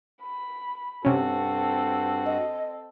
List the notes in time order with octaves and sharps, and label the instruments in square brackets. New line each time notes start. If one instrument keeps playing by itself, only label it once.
[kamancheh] B5
[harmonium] G2 F#4 [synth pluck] C3 C#4 [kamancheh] C4 A4
[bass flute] D#5